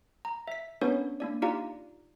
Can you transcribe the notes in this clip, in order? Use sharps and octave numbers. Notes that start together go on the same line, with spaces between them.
A#5
E5 B6
B3 C#4 D4 A#4 B4 C#5
A#3 D4 D5
D#4 F4 G4 D5 F5 A#5